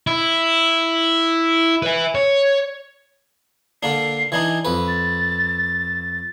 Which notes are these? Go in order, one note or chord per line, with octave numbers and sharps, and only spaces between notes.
E4
B4 E5
C#5
D3 A#3 D4 C7
E3 D4 D#4 G#6
F2 B4 B5
A6